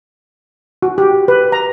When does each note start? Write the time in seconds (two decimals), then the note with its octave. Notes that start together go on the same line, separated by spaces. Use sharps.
0.82 F#4
0.98 G4
1.28 B4
1.52 A#5